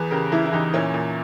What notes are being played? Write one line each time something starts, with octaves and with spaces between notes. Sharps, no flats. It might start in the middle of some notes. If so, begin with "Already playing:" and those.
Already playing: E2 G#4 B4
C#3 G4 A#4
E3 E4 G#4
E4
E2 D#4 G4
A#2 C#4 E4
A#2